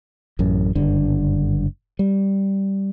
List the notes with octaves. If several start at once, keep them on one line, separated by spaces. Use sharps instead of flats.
A1 F#2
F#1 G2 D3
G3